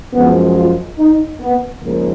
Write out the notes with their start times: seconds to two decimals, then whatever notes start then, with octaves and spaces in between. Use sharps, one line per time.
0.13 F#2 F3 G#3 B3
0.56 F4
0.98 D#4
1.40 B3
1.83 D#2 C#3 F3 G#3 A#3